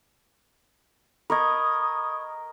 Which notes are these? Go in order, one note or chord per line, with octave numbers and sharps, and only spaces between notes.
A#4 D#5 B5 C#6 D#6 G#6